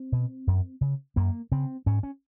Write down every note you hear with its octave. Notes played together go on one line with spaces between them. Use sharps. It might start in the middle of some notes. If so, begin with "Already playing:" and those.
Already playing: C4
B2
F#2
C#3
F#2 A#3
C#3 C4
G#2 C#4
C#4